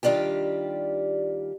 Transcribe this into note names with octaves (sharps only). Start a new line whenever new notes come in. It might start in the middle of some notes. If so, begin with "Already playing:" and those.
D#3 G3 D4 F4 G4